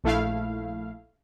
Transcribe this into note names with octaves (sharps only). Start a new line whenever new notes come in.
A#1 A3 E4 F5